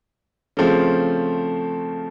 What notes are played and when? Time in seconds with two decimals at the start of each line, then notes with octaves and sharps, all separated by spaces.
0.57 C#3 F3 A3 C4